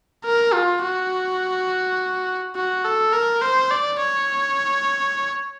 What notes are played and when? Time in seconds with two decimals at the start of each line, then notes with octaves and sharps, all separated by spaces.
0.24 A#4
0.53 F4
0.83 F#4
2.56 F#4
2.84 A4
3.13 A#4
3.42 C5
3.71 D5
4.00 C#5